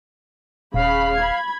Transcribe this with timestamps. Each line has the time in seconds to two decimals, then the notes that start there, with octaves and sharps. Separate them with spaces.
0.74 D#1 C#3 F5 B5
1.16 B5 G#6